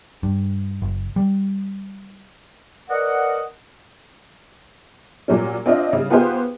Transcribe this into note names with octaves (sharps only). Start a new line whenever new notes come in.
G2
F#1
G3
A#4 B4 D5 D#5 F#5
A#2 F#3 G3 C#4
C4 D4 F4 D#5 E5
C#3 G3
B3 F4 G4 G#4 B4 C5